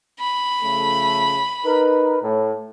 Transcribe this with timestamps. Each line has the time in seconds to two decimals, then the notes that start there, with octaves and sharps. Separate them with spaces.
0.20 B5
0.63 C#3 F3 A3
1.64 D#4 A#4 B4
2.22 A2